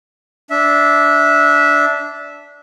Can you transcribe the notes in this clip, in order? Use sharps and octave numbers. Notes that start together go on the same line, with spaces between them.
D4 E5